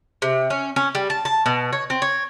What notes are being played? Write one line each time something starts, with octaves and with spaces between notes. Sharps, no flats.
C3
C#4
C#4
G3
A5
A5
B2
C#5
C4
C#5